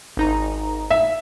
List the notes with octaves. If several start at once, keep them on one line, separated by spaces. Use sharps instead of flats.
G#1 D#4 A#5
E5